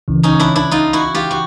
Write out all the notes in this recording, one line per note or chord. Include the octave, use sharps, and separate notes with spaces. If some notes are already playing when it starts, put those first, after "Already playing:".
C#2 C#3 E3
C#4 D#4
D4 E4
D4 E4
D#4 F4
E4 F#4
F4 G4
F#4